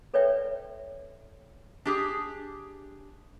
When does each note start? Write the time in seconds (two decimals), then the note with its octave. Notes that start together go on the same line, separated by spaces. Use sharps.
0.14 A4 B4 C#5 D5 E5 G5
1.85 D4 G4 G#4